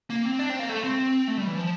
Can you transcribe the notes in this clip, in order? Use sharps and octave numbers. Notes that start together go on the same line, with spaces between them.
A#3
C4
D4
C4
A#3
A3
C4
A3
G3
E3
F3